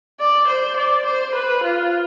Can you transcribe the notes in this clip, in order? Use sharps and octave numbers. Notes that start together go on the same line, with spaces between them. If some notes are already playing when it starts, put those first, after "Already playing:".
D5
C5
D5
C5
B4
F4